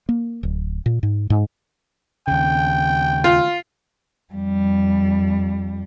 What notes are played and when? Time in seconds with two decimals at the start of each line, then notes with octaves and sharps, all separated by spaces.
0.09 A#3
0.43 D1
0.86 A#2
1.03 G#2
1.30 G#2
2.28 D#2 C#3 G5
3.24 F4
4.33 F2 G3